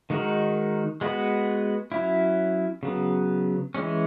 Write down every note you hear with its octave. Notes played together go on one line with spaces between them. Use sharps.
D#3 G#3 D#4 F#4 A#4
G#3 B3 F#4 B4
F#3 C#4 E4
C#3 F#3 B3
E3 G#3 C#4